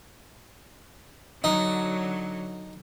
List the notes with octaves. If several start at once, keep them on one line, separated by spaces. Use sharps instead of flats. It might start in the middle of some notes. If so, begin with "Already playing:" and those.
D3 F#3 D#4